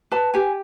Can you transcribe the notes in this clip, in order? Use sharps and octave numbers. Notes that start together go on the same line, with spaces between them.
B4 A5
G4 G#5